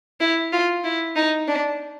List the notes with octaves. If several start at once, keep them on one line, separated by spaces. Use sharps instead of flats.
E4
F4
E4
D#4
D4